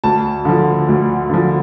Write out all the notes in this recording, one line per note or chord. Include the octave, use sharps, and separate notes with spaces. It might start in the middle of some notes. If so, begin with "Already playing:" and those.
D2 A5
D3 F3
D2
D3 F3